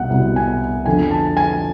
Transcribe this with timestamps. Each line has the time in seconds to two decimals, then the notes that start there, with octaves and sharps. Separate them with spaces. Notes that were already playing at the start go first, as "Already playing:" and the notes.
Already playing: C2 B2 F#5
0.10 C2 B2
0.36 G#5
0.86 F2 D3 G#5
1.11 A5
1.37 G#5